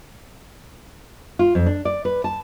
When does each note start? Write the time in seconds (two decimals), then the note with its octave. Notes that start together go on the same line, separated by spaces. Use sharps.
1.39 F4
1.55 F2
1.66 D4
1.85 D5
2.05 B4
2.24 A5